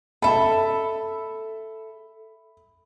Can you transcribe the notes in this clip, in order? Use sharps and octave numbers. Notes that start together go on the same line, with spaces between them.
A4 E5 B5